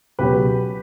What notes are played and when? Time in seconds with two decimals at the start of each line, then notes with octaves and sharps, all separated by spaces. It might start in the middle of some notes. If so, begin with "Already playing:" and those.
0.19 C#2 B2 F#3 G4 B4